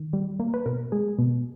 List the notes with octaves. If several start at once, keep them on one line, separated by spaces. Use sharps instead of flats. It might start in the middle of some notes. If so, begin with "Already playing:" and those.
Already playing: D#3
G3
A#3
B4
B2 A#4
G#3 G#4
B2